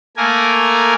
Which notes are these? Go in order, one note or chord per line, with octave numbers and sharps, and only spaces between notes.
A3 A#3 A#4 G#5